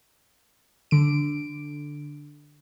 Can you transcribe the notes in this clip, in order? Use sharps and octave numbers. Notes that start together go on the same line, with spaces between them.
D3 D7